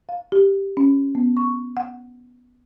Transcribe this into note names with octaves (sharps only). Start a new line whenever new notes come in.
F5
G4
C#4
B3
C#6
F#5